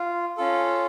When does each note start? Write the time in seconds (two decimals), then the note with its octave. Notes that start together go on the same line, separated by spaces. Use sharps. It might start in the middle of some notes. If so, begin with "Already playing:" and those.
Already playing: F4
0.38 C#4 F4 A4